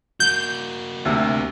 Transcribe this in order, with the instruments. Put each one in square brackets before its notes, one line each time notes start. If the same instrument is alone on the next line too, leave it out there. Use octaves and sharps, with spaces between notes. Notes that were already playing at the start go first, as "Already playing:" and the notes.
[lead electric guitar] A#3 F#4 [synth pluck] G6
[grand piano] D2 C3